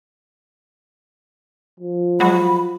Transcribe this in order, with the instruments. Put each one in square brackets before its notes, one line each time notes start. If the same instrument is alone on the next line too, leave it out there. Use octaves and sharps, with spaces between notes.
[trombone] F3
[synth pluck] F#3 G#3 F#4 [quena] B5